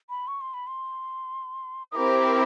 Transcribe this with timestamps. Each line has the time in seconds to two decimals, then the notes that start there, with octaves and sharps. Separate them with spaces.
0.09 B5
0.27 C#6
0.41 C6
0.54 B5
0.67 C6
1.91 D#6
1.96 C4 E4 G4 A#4 D6